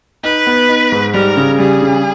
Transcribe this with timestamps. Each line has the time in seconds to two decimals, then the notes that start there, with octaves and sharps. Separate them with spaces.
0.23 D#4 B4
0.47 B3
0.69 D#4
0.92 G#2
1.14 G3 A#4
1.37 C#3
1.59 G3 G#4
1.82 C#3